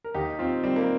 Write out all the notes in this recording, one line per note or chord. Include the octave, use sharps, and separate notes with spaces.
A#4
D#2 D#4 G4
D#2 C4 F4
D#3 G3 C4
A#3